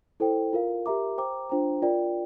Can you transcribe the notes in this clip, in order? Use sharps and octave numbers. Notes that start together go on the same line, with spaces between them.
E4 A4 C5 G5
F4 A#4 F5
G4 A#4 E5 A#5 D6
C5 G5 A#5 D6
D4 F4 C5 G5 A#5
F4 A#4 D5 G5